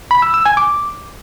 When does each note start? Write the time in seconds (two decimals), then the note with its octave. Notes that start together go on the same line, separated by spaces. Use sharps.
0.11 B5
0.22 E6
0.34 E6
0.45 G#5
0.57 D6